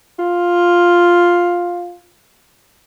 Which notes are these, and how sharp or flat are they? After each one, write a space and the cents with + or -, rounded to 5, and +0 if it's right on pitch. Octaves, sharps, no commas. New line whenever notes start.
F4 +5